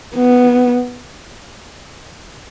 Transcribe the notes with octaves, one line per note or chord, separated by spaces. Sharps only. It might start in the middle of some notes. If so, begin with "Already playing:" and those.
B3